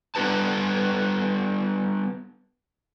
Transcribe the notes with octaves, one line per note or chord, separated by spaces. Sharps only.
G3 B3 D4 G4 B4 A5